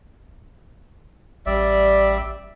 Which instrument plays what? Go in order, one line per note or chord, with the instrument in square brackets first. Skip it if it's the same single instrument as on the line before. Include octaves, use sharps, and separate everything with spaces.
[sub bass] A1 [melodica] G3 D5 E5